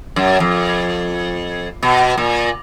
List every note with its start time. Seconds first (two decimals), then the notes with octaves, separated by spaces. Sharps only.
0.16 F#2
0.40 F2
1.83 B2
2.18 A#2